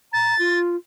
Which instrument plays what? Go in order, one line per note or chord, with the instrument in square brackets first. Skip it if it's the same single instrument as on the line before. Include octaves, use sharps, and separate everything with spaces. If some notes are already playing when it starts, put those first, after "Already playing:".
[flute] A#5 [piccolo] A6
[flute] F4